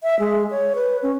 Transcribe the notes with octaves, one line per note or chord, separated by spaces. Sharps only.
E5
G#3
C#5
B4
C#4